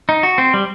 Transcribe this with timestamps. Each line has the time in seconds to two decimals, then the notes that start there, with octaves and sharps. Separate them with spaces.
0.09 D#4
0.23 F#4
0.38 C4
0.54 G3